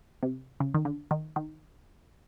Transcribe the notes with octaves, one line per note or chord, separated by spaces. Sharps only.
C3
C#3
D#3
D3
D#3
D#3